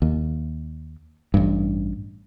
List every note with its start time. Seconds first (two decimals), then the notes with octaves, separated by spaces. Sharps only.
0.02 D#2
1.34 A1 G2